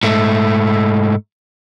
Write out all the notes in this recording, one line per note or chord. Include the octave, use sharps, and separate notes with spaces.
G#2 A3